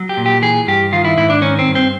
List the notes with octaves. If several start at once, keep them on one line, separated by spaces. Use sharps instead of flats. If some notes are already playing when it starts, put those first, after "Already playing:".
Already playing: F#3
G4
A#2
G4
E3 G#4
G2 G4
D#3 F4
E4
G#2 E4
D4
D#3 C#4
C4
G2
C4